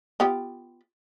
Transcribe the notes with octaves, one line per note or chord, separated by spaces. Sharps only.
B3 F4 G4